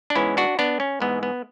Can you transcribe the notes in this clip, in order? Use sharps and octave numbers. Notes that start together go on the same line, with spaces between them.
D4
G#2 E3 G#3 B3 C#4 E4
D4 F#4
B3 D4
C#4
G#2 E3 G#3 B3
B3